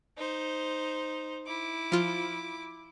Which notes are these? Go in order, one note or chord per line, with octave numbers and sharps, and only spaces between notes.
D#4 C5
E4 D6
F3 F4